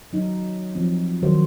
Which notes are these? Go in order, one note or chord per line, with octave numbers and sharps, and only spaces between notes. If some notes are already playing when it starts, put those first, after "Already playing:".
F#3 D#4
F3 C4
D#3 F#3 F#4 C5